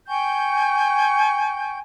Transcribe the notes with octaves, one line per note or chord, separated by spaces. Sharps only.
G5 G#5 C#6 G6